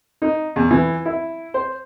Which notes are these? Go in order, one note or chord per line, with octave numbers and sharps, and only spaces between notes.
D#4
E2
E3
E4
C5